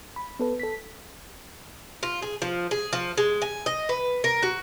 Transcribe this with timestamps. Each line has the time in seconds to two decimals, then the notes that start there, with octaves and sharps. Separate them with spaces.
0.16 B5
0.39 B3 A4 B4
0.60 A4 B6
2.03 F4
2.22 G#4
2.42 F3
2.71 G#4
2.93 F3
3.18 G#3
3.42 G#5
3.66 D#5
3.89 B4
4.24 A#4
4.43 F#4